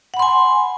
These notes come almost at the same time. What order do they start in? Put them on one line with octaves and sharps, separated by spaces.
F#5 B5 C6 G#5